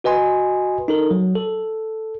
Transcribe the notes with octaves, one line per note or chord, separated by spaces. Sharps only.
F#4 B4 D#5 G#5 C6
D#4 A4 A#4
F#3
A4